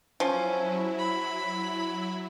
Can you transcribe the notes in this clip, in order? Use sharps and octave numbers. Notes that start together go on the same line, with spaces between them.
F3 F#3 C#4 E4
B5